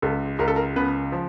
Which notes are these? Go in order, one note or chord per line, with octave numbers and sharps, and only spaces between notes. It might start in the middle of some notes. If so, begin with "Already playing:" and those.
C#2 A4
C#2 A#4
A4
A#4
C#3 B3 B4
F3